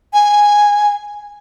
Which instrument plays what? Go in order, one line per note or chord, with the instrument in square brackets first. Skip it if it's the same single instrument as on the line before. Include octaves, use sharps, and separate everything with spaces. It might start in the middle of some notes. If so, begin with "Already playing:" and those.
[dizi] G#5